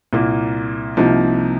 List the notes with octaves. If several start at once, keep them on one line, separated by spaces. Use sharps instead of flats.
C2 A#2 A#3
C2 C3 F3 A#3 D#4